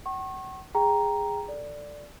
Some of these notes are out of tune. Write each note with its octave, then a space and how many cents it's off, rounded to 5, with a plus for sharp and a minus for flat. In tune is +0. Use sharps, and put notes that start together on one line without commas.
F#5 +45 C#6 -35
G#4 -10 G5 +0 A#5 +0
A4 +20 D5 +0